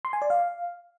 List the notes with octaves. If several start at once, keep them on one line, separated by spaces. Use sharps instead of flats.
C6
G#5
D5
F5